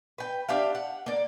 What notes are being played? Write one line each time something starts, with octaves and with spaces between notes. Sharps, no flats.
B4 G5
D4 G4 E5 F5
F#5
A#3 D5